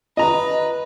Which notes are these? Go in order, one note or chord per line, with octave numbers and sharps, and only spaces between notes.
B4 D#5 A#5